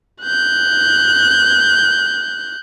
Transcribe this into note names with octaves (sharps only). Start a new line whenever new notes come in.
F#6 G6